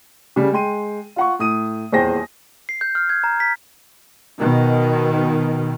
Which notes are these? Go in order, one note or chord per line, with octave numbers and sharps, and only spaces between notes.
C#3 G3
G#3 G5 C6 D#7
F4 F#5 C#6
A2 D#6 D#7
D#1 E2 G#4 C5 G5 A#6
C7
G6
F6
G#6
A#5
B6
B2 D#3